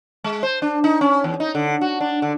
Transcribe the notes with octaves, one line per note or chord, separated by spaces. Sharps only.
G#3
C5
D4
D#4
C#4
E2
D#4
D3
F#4
D4
D3